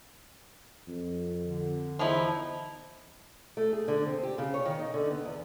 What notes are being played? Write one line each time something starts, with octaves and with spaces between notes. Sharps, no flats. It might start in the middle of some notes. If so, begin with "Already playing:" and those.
F2
D3
E2 F3 D#4 E4
A3
G#4
D3
C4
G4
C#3
C#5
D#3
D#4
D3
B3
E2